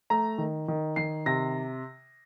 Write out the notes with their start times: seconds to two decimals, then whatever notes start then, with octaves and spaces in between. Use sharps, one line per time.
0.10 A3 A#5
0.38 D#3
0.68 D#3
0.96 D#3 C7
1.26 C3 A#6